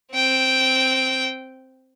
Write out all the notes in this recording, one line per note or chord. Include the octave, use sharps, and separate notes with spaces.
C4 G5